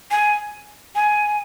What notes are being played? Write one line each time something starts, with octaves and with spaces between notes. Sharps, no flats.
G#5
G#5